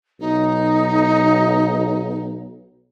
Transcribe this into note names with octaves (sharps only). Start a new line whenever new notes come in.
B1 D#4